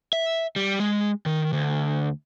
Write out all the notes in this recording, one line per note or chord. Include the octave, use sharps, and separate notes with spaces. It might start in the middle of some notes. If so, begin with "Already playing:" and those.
E5
G3
G#3
D#3
D2